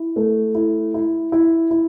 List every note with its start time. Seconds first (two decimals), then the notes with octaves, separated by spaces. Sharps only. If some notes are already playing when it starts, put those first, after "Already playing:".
Already playing: E4
0.16 A3
0.55 E4
0.94 E4
1.32 E4
1.71 E4